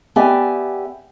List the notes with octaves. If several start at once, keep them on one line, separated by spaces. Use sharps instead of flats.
B3 G4 D5 E5 G5 G#5